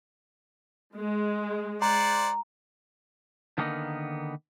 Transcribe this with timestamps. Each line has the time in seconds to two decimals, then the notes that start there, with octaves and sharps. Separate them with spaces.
0.97 G#3
1.82 C5 D5 F#5 A#5
3.58 D3 D#3 G3 A#3 B3 D#4